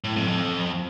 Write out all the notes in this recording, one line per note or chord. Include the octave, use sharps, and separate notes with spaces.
A2
F2
F2